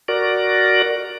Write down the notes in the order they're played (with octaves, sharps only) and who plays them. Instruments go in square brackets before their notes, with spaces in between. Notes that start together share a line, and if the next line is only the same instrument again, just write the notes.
[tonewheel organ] F#4 A#4 D5